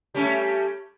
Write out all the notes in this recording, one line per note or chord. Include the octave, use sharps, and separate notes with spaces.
G3 A3 C#4